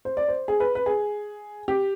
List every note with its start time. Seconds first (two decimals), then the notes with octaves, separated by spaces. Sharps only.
0.05 C5
0.17 D5
0.28 C5
0.48 G#4
0.60 B4
0.75 B4
0.86 G#4
1.68 G4